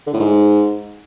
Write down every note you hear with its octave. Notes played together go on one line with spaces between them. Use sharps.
D3
A2
G#2